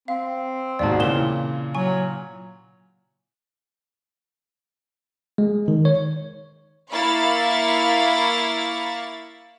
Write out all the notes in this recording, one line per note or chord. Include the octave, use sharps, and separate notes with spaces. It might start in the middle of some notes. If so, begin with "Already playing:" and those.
C4 F5
D#2 G#2 B2 D5 A5
A#2 C#3 E3 A#4 E7 G7
F#3 G#5 C#6
G#3
D#3
C#5
A#3 E4 F5 B5 C#6 A6